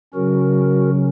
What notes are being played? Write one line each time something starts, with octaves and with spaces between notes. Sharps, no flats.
C#3 F#3 C#4 F#4 A#4